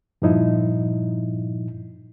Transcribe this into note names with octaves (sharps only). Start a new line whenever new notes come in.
G2 A#2 F3 D#4 E4